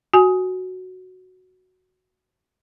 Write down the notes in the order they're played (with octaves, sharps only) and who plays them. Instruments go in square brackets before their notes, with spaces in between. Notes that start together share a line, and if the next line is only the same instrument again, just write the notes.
[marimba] F#4 G#5